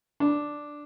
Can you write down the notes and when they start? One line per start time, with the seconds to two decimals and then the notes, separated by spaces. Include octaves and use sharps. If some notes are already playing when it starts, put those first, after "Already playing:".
0.20 D4